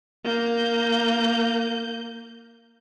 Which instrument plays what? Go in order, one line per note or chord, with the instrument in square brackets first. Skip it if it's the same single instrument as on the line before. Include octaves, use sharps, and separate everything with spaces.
[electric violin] A#3 G6